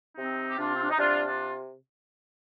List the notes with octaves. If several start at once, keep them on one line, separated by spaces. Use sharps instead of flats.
C3 C4 D#4
G4
C3 D4 F4
C4
D4
D#4
C3 D4 F4
D4 F4